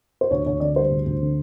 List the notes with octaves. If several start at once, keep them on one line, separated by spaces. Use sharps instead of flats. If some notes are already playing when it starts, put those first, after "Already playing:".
C5
D2 C#5
D2 C#5
D3 D5
G3 C5
D2
D2
D3